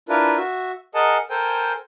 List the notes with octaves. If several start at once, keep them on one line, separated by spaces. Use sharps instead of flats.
D4 E4 F4 A#4 B4
F#4 E5
G#4 A#4 D#5 F#5 G#5 A5
A4 A#4 C5 G5 G#5